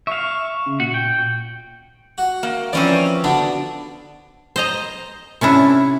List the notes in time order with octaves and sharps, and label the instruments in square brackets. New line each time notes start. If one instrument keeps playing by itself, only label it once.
[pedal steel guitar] E5 F5 [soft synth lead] C#6
[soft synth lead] C#3
[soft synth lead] A#2 [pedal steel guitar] F#4
[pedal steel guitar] G5
[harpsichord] F#4
[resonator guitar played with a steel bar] A#3
[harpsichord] E3 F3 A#4 [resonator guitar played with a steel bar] C4 C#4 D5
[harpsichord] B2 D3 B3 [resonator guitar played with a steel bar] D4
[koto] C5 D#5 A#5
C3 C#4 D4 E4